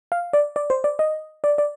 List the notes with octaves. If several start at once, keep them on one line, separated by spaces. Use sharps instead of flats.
F5
D5
D5
C5
D5
D#5
D5
D5